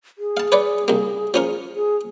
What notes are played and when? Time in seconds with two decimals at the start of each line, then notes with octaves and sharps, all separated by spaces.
0.18 G#4
0.37 F5 A5
0.52 B4 C#5 D5
0.88 C2 A#3
1.34 F3 C#4 A#4
1.74 G#4